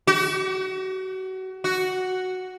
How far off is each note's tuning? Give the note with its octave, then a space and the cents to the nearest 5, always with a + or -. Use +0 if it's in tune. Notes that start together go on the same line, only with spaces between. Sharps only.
F#4 +30
F#4 +0